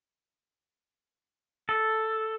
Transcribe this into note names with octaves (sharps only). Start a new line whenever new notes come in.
A4